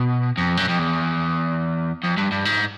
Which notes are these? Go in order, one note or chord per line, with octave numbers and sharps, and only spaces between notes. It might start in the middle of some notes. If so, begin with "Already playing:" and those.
Already playing: B2
F2
F#2
F2
E2
F2
G2
G2
G#2